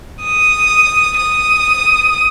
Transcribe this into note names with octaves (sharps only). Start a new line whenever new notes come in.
D#6
D#6